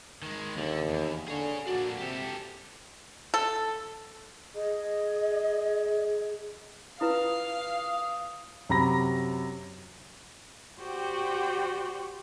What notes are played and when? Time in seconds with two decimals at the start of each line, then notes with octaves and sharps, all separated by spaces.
0.22 D#3 G#3
0.57 D#2 D3
0.88 E2
1.27 D3 G#4 C#5
1.67 A#3 D4 F#4
1.98 C3 G4 A4
3.34 A4
4.55 G#4 D#5
7.01 E4 F4 B4 F5 D#6
8.69 F#2 C3 A#5 B5 A#6
10.80 F#4 G4 C5 D5 G5